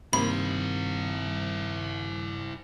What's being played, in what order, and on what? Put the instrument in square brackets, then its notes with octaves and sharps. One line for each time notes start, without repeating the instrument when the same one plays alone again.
[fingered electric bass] G2 [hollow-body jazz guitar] C3 D#3 A#3 [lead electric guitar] E4 C5 [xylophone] B5